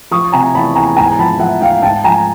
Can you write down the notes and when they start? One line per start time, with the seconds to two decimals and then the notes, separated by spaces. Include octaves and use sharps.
0.11 F3 C#6 D#6
0.32 C3 G#5 A#5
0.55 E2 A5 B5
0.75 E2 G#5 A#5
0.97 G#2 G#5 A#5
1.19 F3 A5 B5
1.39 F3 E5 F#5
1.61 G#2 F5 G5
1.82 G#2 G5 A5
2.04 F3 G#5 A#5